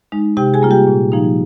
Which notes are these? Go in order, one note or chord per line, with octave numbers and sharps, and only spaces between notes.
G#3 D#4
C3 G4 G5
G#4 G#5
G3 A#3 F4
G4 G5
A#2
F3 A#3 D#4